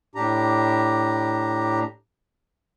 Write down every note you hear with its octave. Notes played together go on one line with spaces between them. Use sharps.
A2 D4 G4 A#5